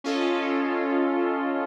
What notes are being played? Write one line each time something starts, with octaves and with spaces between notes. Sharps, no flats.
C#4 F4 A4 D#5